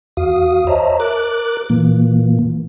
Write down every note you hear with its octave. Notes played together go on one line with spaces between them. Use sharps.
E2 F#4 F5 D#6
C5 C#5 D#5 E5 A5 A#5
A#4 D6 F#6 A6
A#2 E3 A#3